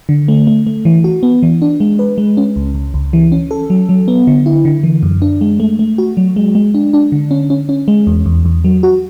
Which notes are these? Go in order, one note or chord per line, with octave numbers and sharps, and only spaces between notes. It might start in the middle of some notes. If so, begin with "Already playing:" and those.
D3
A3
A3
A3
E3
F#4
B3
E3
D4
G#3
B4
G#3
C#4
C#2
C#2
C#2
E3
C#4
A4
F#3
F#3
B3
D3
E4
D3
E3
F#2
D4
G#3
A3
A3
F#4
F#3
G#3
G#3
D4
D4
D3
C#4
C#4
C#4
G#3
E2
E2
E2
F#3
F#4